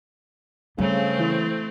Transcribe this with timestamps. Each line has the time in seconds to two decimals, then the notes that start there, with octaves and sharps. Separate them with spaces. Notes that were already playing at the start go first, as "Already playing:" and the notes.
0.78 C#3 G3 A3 C4
1.19 E3 E4